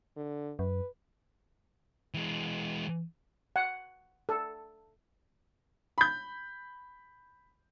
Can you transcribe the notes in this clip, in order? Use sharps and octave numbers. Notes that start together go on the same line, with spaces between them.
D3
F#2 B4
E3 G#3
F#5
A4
B5 G6